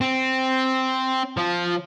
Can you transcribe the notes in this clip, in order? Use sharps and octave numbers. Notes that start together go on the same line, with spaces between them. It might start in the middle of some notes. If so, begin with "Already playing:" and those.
C4
F3